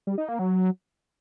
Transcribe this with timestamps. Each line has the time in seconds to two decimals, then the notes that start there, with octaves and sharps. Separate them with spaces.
0.07 G3
0.18 D#4
0.28 A#3
0.39 F#3